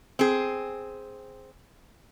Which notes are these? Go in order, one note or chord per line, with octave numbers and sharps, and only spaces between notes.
C4 G#4